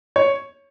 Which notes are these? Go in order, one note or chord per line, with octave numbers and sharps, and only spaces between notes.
C#5